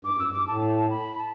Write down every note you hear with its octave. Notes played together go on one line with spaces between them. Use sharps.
G2 D6
F#2 E6
G2 D6
A2 A5
A5
B5
A5